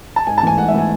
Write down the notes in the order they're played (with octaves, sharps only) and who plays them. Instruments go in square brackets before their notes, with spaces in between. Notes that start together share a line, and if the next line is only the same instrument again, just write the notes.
[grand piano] A5
[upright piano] G#2 [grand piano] G#5
[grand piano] A5
[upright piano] E3 A3 [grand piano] G#5
[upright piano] G#2 [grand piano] F#5
[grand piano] E5
[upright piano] E3 A3 [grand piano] G#5